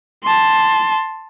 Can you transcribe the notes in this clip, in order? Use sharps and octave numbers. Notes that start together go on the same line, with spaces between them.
A5 C6